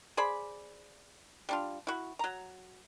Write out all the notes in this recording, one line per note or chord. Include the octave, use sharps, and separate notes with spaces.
G#4 C5 D5 B5
G3 D4 F4
E4 F#4
F#3 A#5